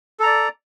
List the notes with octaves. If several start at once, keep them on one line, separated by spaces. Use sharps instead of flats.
A4 D5 A#5